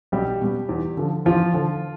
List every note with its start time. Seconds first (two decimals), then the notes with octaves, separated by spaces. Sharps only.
0.12 B1 G3 G4
0.41 B2 G3
0.69 E2
0.97 D3 F3
1.25 E2 F3 F4
1.54 D3 F3